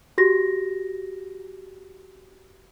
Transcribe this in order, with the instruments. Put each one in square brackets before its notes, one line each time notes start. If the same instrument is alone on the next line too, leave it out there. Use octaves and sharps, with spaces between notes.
[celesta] F#4 G4 A#6